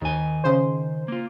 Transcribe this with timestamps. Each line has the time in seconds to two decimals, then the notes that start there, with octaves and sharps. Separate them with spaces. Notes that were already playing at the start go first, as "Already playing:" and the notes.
0.01 D#2 D#3 G#5
0.44 C#3 C5
1.08 A#3 F4